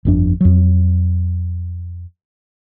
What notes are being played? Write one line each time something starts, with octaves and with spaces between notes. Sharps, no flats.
G1 F2 D4
F2 F#3